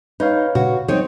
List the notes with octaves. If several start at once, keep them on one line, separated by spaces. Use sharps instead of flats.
D#4 B4 C#5 F5
A#2 C#3 F#4
E3 F#3 C4 D#4 C#5